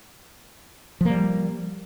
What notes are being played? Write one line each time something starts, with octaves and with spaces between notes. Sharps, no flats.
F3 G3 A#3